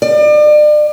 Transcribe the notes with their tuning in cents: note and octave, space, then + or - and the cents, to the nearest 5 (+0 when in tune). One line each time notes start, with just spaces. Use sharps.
D5 +35